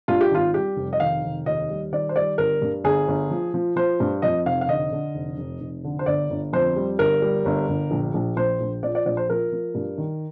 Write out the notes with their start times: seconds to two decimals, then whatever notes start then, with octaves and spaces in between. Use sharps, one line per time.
0.08 G2 F4
0.21 G4
0.31 G#1 F4
0.54 G3 G4
0.77 F1
0.93 D#5
1.00 D#3 F5
1.23 F1
1.46 D#2 D#5
1.70 G3
1.92 D#3 D5
2.09 C5
2.16 G3 D5
2.38 G1 A#4
2.62 G2
2.84 G1 G#4
3.08 G1
3.31 F3
3.54 F3
3.76 F3 C5
4.00 G2
4.22 F2 D#5
4.46 F1 F5
4.61 F5
4.68 D3 D#5
4.92 D3
5.15 F1
5.38 F1
5.61 F1
5.84 D3
5.99 C5
6.06 G1 D5
6.30 G1
6.53 F2 C5
6.76 G3
6.99 G1 A#4
7.22 G3
7.45 G1
7.69 G1
7.91 A#1
8.14 A#1
8.37 A#1 C5
8.61 A#1
8.83 F3 D5
8.95 D5
9.06 A#1 D5
9.17 C5
9.30 F3 A#4
9.52 F3
9.75 G2
9.98 D#3